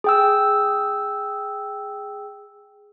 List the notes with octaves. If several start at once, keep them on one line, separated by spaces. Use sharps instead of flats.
G#4 G5 E6